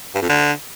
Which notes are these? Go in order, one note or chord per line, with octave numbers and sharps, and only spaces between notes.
G2
F2
D3